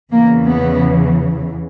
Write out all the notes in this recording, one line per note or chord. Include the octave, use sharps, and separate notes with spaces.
E2 C#3 E3 A#3
B3